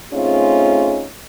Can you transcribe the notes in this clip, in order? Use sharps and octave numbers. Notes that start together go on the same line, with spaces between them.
A3 C4 C#4 D#4 F4 G#4